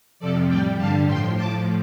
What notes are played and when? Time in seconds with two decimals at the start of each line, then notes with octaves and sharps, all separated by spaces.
0.19 F2 C3 F3 A4 D5
0.48 A2 G3 D5 G5
0.78 G2 D3 G3 F5 A5
1.07 A2 F3 G5 C6
1.36 A2 F3 A5 D6